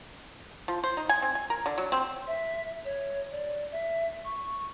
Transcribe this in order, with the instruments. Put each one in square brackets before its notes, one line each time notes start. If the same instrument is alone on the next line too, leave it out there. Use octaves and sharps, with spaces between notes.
[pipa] F3
C5
D#4
G#5
C4
G#5
A#4
D3
F#3
C4
[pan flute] E5
C#5
D5
E5
C#6